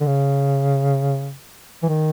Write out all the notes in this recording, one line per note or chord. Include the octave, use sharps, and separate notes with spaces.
D3
C#3
E3
D#3